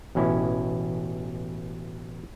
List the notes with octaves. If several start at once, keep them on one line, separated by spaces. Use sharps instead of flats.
A1 B2 C#4 E4